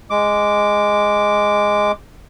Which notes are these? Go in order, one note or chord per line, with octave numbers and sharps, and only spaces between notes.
G#3 D6